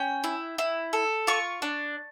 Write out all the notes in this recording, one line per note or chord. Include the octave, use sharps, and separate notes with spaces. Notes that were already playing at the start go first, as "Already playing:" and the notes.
Already playing: C#4 G5
E4
E4
A4
F4 C#6
D4